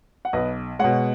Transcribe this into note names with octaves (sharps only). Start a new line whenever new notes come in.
F#5
B1 B4 D#5
B2 G#3 C#5 F#5